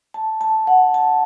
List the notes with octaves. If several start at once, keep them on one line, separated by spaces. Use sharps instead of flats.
A5
A5
F#5
A5